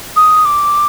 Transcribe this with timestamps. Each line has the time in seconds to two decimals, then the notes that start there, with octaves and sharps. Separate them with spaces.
0.16 D#6
0.45 D6